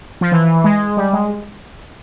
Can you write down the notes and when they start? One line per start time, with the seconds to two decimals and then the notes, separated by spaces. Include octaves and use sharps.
0.21 F3
0.32 E3
0.64 G#3
0.97 G3
1.13 G#3